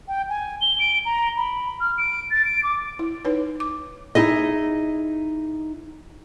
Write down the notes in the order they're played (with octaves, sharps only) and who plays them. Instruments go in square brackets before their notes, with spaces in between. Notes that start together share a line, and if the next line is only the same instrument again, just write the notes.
[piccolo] G5
G#5
G7
D7
A#5
B5
F6
D7
A6
D7
D6
[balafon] E4
D#4 B4 C#5
D6
[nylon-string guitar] D#4 E4 G#4 D#5